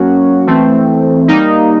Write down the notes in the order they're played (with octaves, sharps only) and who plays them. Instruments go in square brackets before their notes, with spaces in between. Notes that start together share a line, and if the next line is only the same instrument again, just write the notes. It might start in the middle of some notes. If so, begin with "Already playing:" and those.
Already playing: [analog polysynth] F#3 A#3 C#4 F#4
E3 A3 C4
G3 A#3 D#4